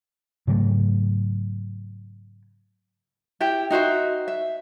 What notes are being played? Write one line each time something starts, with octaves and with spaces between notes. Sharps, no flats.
G#2 C#3 F#3 A3
E4 G4 G5
D#4 F#4 C5 E5
E5